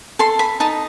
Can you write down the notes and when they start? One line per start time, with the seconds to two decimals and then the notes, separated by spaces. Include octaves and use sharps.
0.19 A4 C6
0.39 B5
0.60 D#4 A5